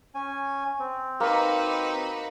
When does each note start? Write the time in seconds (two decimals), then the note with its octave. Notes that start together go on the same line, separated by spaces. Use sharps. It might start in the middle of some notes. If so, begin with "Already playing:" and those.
0.15 C#4 G#5
0.80 C4
1.20 A#3 D#4 F#4 B4